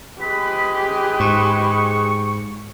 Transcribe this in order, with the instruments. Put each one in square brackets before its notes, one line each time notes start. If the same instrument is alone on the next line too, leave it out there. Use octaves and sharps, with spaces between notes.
[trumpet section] G#3 G#4 B4 [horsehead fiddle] G4 [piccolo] B6
[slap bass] G#2 [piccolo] C#6